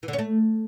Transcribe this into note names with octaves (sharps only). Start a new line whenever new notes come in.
E3
D3
C#4
A3